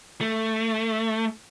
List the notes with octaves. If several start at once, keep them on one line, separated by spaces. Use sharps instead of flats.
A3